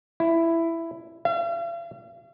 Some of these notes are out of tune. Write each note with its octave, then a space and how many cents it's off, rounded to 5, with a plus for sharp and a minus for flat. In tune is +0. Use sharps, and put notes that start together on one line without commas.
E4 +10
F5 -45